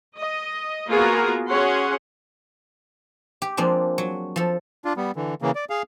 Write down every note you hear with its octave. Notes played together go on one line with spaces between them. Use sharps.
D#5
A#3 B3 F4 F#4 G#4 A#4
C#4 F#4 G#4 C#5 F#5 C6
G4
F3 G#3 A#3 C4 D4
F#3
F3 A4
D4 F4
G3 B3
D3 E3
C#3 E3 A#3
D5
G#4 F5